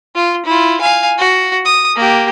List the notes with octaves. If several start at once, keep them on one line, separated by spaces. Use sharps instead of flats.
F4
E4 F4
F5 G#5
F#4
D#6
A#3 G4